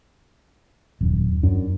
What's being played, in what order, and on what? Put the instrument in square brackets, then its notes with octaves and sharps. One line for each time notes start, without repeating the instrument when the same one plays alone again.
[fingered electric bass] D#1 F#2
[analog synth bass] F#2 [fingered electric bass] D4